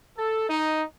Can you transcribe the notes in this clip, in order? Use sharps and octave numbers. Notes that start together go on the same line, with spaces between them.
A4
D#4